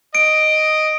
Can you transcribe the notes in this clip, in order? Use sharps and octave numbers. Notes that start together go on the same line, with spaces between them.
D#5 D7